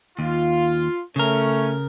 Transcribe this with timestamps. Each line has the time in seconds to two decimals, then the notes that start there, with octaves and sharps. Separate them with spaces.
0.19 D#2 F4
1.16 C#3 A3 C#4 A#4